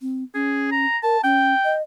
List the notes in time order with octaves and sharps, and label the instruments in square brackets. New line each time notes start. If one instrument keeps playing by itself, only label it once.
[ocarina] C4
[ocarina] C#4 [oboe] G#4
[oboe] A#5
[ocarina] A#4 [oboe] A5
[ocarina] C#4 [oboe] G5
[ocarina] D#5